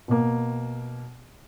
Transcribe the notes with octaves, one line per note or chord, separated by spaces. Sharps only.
B2 A#3